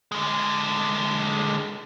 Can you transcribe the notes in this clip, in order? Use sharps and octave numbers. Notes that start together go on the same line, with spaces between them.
D3 G#3